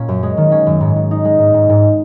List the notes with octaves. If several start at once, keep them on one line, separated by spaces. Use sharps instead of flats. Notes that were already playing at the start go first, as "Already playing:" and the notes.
Already playing: A#2 A#3 C#4
F#2
G#3
D#3
C#4
F#2
G#2
G#2
D#4
G#3
G#2
G#2
G#2